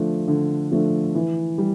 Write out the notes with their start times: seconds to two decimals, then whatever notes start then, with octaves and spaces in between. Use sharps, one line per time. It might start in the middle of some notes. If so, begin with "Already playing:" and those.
Already playing: D3 F3 A3 D4
0.28 D3
0.72 F3 A3 D4
1.15 E3
1.58 G3